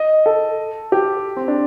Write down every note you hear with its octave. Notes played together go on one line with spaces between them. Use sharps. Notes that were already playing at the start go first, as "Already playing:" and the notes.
Already playing: D#5
A4
G4
C4
D4